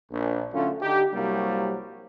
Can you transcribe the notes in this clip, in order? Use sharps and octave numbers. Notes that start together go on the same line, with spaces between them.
A#1
D3 F#3 A3 C#4 F4
D3 D#4 G4
C2 C3 F#3 G3 A#3